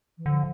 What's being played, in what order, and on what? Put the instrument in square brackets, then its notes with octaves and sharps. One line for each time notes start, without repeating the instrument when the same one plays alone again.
[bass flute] E3
[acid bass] D3 [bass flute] F3